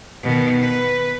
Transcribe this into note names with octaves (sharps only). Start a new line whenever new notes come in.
B2 D#3
B4